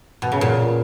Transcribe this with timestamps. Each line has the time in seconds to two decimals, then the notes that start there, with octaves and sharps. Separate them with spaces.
0.22 B2
0.32 C#3
0.41 A#2